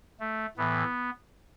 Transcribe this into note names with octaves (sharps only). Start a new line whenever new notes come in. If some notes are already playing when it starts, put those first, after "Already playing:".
A3
A2 E3 B3